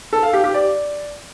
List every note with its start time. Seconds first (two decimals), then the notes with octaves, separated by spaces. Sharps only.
0.13 A4
0.23 F5
0.33 G4
0.44 G4
0.54 D5